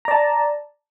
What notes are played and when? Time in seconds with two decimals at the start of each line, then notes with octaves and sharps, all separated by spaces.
0.05 A#5
0.08 D5
0.11 A5